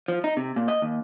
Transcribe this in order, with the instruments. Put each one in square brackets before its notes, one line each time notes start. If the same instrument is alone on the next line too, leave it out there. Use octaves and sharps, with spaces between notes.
[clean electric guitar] F3
D#4
C3
A#2
D#5
D#2